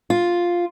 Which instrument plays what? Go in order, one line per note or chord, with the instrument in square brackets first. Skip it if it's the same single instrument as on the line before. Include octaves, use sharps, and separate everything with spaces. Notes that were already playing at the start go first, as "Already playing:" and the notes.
[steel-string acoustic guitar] F4